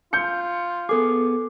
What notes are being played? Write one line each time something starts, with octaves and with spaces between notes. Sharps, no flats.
F4 G6 C#7
B3 G#4 A4 D6